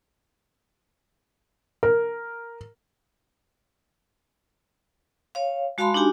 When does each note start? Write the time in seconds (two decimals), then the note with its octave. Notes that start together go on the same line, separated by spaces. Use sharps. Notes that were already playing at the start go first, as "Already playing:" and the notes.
1.83 A#4
5.35 C#5 F5
5.78 G#3 F#4 F5 A5 B5 C6
5.94 D4 D#4 F#4 G4 G#5